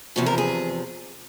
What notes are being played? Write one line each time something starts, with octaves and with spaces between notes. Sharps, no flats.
E2 C3 F3 F#4
A#4
G#4